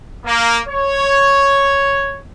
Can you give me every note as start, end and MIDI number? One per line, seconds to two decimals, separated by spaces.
0.25 0.57 58
0.67 2.17 73